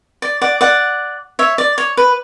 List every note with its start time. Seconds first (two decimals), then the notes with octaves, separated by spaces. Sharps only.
0.22 D5
0.41 D5 F#5
0.61 D5 F#5
1.39 C#5 E5
1.58 D5
1.78 C#5
1.97 B4